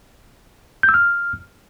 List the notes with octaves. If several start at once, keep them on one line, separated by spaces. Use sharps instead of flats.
G6
E6
F6